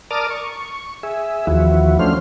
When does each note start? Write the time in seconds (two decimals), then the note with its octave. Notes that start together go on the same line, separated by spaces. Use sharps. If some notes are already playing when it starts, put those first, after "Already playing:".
0.11 A#4 D5 A5 D6 D#6 F6
0.30 C#6
1.03 G#4 E5
1.47 D#2 E3 F3 E4 F#4
1.99 F3 A3 C#4 D4 C5 F6